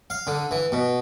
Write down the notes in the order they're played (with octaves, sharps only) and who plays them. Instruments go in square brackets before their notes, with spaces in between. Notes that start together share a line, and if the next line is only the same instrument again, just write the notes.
[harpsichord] F5
D3
E3
B2